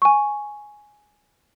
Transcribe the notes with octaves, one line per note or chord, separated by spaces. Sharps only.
G#5 C#6